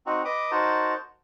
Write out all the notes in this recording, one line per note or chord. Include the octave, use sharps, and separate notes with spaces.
C4 D#4 F#4
B4 D#5 D6 D#6
D#4 F#4 A#4 C5 A5